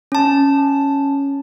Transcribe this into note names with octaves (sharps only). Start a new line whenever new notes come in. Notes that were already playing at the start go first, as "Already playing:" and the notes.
C#4 A5